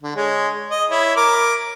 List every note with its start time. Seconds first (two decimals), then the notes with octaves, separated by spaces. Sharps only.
0.03 D3
0.16 G#3 C#5
0.71 D#5
0.90 E4 C#5 B5
1.16 A#4 D6